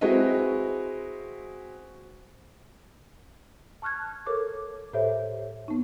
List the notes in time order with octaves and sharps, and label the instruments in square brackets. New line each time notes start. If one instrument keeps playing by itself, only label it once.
[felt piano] G#3 C4 E4 F#4 B4 D#5
[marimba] A5 C#6 F6 F#6 G#6
A4 A#4 C#5 D6
A2 A4 C5 C#5 E5
B3 D#4